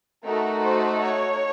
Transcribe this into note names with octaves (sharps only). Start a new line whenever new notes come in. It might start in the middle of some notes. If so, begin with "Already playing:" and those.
A3 D#4 F#4 A4 A#4
C5
C#5